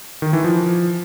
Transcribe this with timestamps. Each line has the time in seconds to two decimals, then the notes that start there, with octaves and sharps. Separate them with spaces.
0.22 D#3
0.33 E3
0.44 F3